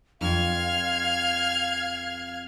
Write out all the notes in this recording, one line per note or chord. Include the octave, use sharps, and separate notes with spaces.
F2 D#4 F5 F6 G#6